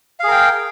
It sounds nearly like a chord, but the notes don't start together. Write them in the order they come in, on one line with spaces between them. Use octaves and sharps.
F5 G#4 A#4 G5